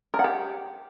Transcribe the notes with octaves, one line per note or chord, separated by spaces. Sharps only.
A#4
F#5
G4